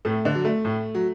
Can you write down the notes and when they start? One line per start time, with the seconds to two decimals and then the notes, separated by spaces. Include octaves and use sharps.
0.05 A2 A3
0.25 D3 D4
0.35 F#3
0.45 A3
0.65 A2
0.95 F#3